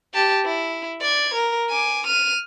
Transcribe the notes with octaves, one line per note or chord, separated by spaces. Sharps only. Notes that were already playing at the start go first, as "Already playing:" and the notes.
G4 A5
E4
D5 G#6
A#4
G#5 D6
F6 D#7